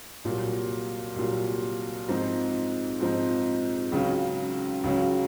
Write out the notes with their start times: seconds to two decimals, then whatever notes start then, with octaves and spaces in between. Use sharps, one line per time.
0.24 C2 A#2 F#3
1.16 C2 A#2 F#3
2.08 G#2 F3 C4 D#4
3.00 G#2 F3 C4 D#4
3.92 C#2 C#3 F#3 C#4
4.84 C#2 C#3 F#3 C#4